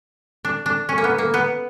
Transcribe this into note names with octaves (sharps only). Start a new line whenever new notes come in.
D4
D4
C#4
A#3
B3
A#3
B3